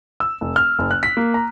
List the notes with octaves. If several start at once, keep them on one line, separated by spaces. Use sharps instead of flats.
E6
F1
F6
F#1
F#6
B6
A#3
A#5